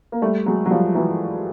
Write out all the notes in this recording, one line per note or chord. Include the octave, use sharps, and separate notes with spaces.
A#3
G3 A3
F#3 G#3
F#3
F3 G3
E3 F#3